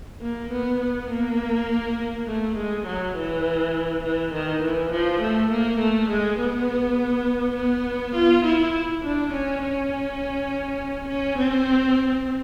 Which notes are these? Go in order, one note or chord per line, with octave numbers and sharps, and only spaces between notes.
A#3
B3
B3
A#3
A3
G#3
F#3
E3
E3
D#3
E3
F3
A3
A#3
A3
G#3
B3
B3
F4
E4
D4
C#4
C#4
C#4
C4